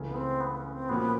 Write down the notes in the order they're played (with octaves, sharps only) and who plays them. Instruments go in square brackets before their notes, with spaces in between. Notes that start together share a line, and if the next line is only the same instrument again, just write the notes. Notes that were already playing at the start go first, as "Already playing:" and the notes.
Already playing: [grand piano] C#2 C#3 E3 A3
[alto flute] B3
C4
B3
C#4
C4
[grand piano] A#2 F3 A#3 C#4 F#4 [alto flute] B3